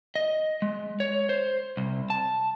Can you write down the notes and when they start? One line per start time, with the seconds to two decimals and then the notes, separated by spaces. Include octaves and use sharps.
0.15 D#5
0.62 G#3
1.00 C#5
1.29 C5
1.77 C2
2.10 A5